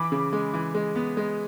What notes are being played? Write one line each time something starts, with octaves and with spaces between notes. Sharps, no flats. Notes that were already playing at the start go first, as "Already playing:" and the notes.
Already playing: E3 B5 D6
C#3
G#3
E3
G#3
B3
G#3